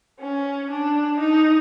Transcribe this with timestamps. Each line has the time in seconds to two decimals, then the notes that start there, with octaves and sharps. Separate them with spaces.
0.20 C#4
0.69 D4
1.19 D#4